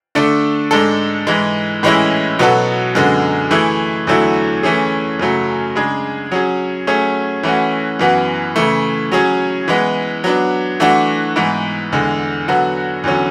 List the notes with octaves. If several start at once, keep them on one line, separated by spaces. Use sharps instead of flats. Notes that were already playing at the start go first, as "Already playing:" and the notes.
D3 A3 D4 A4
G#2 G#3 D4 A4
G#2 E3 G#3
A2 E3 G#3 C#4 E4
B2 F#3 B3 F#4 A4
F#2 D3 G#3 B3
E3 A3 E4 G#4
E2 D3 F#3 A3 E4
E3 A3 C#4 G#4
F#2 C#3 F#3 A3
C#3 G#3 D4 G#4
F#3 C#4 G#4
F#3 A3 C#4 G#4
E3 A3 C#4 F#4
F#2 E3 B3 F#4
C#3 E3 A3
F#3 C#4 G#4
E3 G#3 B3
F#3 B3 D4
E3 A3 D4 F#4
G#2 E3 B3
E2 D3 G#3
D3 F#3 B3 F#4 A4
E2 D3 F#3 C#4